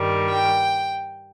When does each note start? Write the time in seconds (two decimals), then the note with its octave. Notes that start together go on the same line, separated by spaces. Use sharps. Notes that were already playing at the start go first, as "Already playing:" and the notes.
Already playing: G2 D#3 G3
0.28 G5